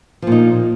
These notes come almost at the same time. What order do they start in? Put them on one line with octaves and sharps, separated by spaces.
F3 A#2 D#4